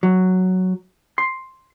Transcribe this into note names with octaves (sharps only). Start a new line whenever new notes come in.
F#3
C6